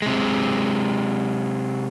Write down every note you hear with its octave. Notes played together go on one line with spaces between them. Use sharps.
C3 G#3